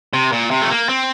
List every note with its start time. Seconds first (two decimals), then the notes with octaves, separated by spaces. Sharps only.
0.13 C3
0.32 A#2
0.51 C3
0.62 A3
0.71 A#3
0.89 C4